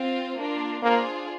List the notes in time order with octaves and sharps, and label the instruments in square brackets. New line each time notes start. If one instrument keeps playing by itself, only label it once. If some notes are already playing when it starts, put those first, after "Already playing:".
Already playing: [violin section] C4 F4 C5
A#3 D4 F4
[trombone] A#3 [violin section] D4 F4 G#4 C5